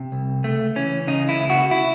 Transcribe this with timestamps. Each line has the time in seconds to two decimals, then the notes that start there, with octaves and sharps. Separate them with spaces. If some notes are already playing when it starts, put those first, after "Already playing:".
Already playing: C3
0.12 C2
0.44 C#2 A3
0.76 E3 C#4
1.07 C#3 D#4
1.29 E4
1.40 C#2
1.50 F#4
1.71 E4